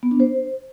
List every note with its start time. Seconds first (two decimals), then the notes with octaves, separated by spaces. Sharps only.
0.03 B3
0.11 D4
0.20 C5